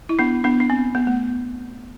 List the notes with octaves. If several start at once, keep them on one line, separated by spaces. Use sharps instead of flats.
E4
B3 D4
B3 D4
D4
C4
B3
A3